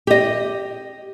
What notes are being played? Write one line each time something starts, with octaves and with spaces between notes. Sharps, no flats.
G4 D#5